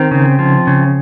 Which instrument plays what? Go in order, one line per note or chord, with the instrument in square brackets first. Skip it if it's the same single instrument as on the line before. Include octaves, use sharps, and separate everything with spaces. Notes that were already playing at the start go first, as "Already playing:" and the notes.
Already playing: [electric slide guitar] D#3 C4
C#3
F3
C#3